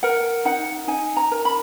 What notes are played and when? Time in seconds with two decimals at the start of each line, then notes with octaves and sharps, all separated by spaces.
0.03 A#4 F#5
0.45 D#4 F#5
0.88 D#4 G#5
1.17 A#5
1.31 A#4
1.45 B5